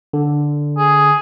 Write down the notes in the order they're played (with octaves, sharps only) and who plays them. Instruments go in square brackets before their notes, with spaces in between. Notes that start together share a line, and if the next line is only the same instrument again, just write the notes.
[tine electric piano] D3
[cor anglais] G#4